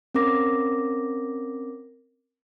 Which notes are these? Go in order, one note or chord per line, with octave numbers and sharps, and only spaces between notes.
C4 C#4 A#4 D6 A#6